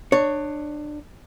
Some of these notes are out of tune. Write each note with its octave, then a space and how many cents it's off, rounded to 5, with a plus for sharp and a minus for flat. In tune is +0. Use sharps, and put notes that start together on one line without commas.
D4 +25 C#5 +0